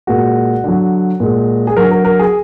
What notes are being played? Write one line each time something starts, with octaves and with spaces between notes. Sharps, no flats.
A#2 G#3 F#4
D3 F#3
A#2 G#3
G#4
D3 F#3 A#4
A#4
A#4
G#4